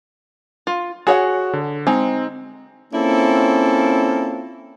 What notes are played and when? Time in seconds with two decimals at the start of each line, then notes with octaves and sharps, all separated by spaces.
0.67 F4
1.07 F#4 G#4 C#5 F#5
1.53 D3
1.87 G#3 C4 D#4
2.94 A#3 C4 C#4 E4 F4 A4